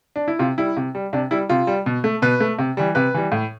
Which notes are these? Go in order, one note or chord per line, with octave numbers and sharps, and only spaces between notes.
D4
E4
C3 F4
G3 E4
C3
G3
C3 D4
G3 E4
C3 F4
G3
B2
A3
B2 B4
A3
C3
E3 G3
C3 B4
E3 G3
A2